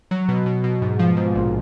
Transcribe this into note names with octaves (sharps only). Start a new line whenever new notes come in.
F#3
B2
B2
B2
G#2
F3
G#2
A#1